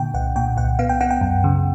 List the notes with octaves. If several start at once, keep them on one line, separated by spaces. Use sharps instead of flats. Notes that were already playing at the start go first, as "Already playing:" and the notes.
Already playing: A#2 D3 G5
C2 F#5
A#2 G5
C2 F#5
B3 F5
G5
B3 F#5
G5
F#2
C#3